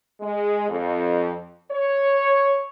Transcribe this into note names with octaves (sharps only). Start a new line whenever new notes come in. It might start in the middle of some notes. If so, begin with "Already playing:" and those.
G#3
F2
C#5